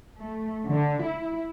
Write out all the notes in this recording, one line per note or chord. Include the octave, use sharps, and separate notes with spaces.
A3
D3
E4